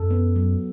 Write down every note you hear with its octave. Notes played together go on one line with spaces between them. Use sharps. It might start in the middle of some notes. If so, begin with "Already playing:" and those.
Already playing: F#2 A4
B3
F#3